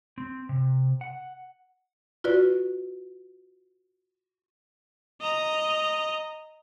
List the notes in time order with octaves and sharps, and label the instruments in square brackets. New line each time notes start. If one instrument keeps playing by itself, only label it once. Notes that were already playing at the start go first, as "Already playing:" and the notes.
[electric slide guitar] C4
C3
F#5
[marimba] F4 F#4 B4 D5
[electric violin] D#5 A#5